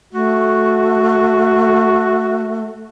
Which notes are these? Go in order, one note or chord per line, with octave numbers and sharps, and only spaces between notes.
A3 F#4